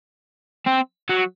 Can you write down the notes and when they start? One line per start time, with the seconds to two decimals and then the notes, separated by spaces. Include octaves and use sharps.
0.66 C4
1.09 F#3